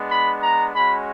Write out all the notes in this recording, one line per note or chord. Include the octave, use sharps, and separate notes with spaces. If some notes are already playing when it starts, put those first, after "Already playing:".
Already playing: G#3 B3 D4
B5
A#5
G#3 C#4 F#4 B5